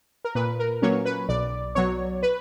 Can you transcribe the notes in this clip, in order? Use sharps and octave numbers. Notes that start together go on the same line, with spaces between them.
A#4
A#2 B4
A#4
F#3 A#3 C#4 C#5
B4
B1 D5
B2 F#3 C#5
B4